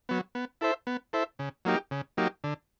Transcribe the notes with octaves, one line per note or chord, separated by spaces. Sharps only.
F#3 B3
B3
E4 A4 C5 E5
B3
E4 A4 C5 E5
C#3
F#3 A#3 D#4 G4
C#3
F#3 A#3 D#4 G4
D3